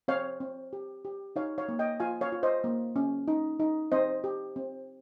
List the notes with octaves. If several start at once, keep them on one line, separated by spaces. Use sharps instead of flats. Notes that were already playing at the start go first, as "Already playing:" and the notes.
C4 C#5 F5
C4
G4
G4
D#4 C#5 F5
C#5 F5
A#3
D#5 G5
F4 F5 G#5
C#5 F5
F4
C5 D#5
A#3
C#4
D#4
D#4
C4 C5 D#5
G4
C4